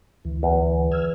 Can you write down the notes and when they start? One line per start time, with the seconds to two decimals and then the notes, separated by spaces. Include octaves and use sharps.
0.25 D2 E3
0.43 E2
0.91 E6 F6 G#6